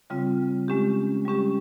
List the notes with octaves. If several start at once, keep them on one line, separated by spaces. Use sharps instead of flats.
C#3 G3 C4 F4
G#3 C#4 G4
G3 C#4 G4